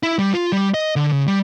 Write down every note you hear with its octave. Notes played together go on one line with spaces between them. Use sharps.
E4
G3
F4
G3
D#5
D3
C#3
G3